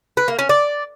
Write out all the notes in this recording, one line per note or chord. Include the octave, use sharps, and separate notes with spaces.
B4
A#3
C#4
D5